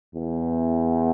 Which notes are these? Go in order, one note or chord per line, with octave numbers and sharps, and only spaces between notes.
E2